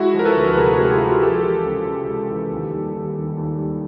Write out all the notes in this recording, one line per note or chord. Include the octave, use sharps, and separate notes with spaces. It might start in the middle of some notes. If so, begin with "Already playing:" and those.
Already playing: G#3 E4 F#4
F3 A#4
A4 B4
D2
B4
C3 G#4 A#4
F#4 G#4
G#3
F4 G4
F3
F#4 G#4
G#3 G4 A4
E3
C#2
C#3
G#3
E3
D#2
G3
D#2
D#3
D#2
G3